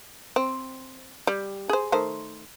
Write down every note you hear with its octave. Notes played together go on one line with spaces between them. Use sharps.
C4
G3
G#4 C5
D#3 A3 C5